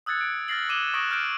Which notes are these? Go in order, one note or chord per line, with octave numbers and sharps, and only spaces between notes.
D#6 E6 F#6 G#6 A6 C#7
D7
F6 A6 A#6 C7 F#7
D6 D#7 E7 F#7 G7
C#6 D#6 F#6 A#6 D7 F#7
F6 G6 D7